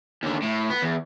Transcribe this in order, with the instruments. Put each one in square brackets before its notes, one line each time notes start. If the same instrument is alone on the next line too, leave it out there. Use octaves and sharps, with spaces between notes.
[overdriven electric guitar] D#2 D3
A2
B3
E2